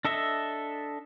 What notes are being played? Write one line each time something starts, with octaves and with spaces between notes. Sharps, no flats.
D4 A4 D#5 E5